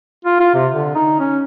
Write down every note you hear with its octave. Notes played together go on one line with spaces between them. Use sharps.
F4
F4
C3
D3
D#4
C#4